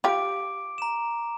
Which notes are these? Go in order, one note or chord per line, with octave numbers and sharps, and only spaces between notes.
F4 G4 D6 D7
A#5 E7